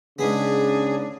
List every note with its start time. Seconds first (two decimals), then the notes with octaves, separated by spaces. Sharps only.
0.19 G#2 C#3 B3 D4 G#4